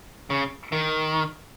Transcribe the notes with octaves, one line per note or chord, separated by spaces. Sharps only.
C#3
D#3